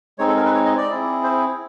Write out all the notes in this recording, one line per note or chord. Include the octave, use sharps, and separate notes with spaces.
G#3 C4 D#4 C#5
A4
A#4
B4
C#5
D#5
D5
C4 E4 G#4
C5